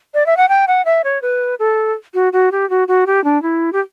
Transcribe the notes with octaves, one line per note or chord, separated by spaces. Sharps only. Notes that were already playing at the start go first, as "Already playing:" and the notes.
D5
E5
F#5
G5
F#5
E5
C#5
B4
A4
F#4
F#4
G4
F#4
F#4
G4
D4
E4
G4